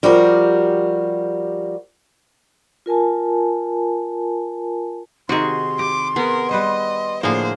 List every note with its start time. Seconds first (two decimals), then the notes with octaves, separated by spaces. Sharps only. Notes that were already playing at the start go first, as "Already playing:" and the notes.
0.03 F3 G3 F#4 G4 A#4
2.86 F4 A#4 G#5 A5
5.29 C3 D#3 F#4 G#4 C6
5.79 G4 D6
6.16 B3 G#4 A#4
6.51 G3 B4 C5 D#5
7.23 A2 D3 F3 A#3 G#4 C5